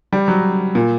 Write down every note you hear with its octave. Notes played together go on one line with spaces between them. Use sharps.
G3
F#3
A#2